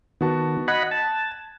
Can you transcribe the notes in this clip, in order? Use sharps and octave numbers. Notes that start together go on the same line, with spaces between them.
D#3 B3 F#4 A5
D#5 F#5 B5 F#6 G#6
A5